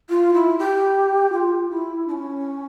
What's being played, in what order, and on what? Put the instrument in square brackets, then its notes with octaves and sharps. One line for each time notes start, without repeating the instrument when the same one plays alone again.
[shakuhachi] F4
E4
G4
F4
E4
D4
C#4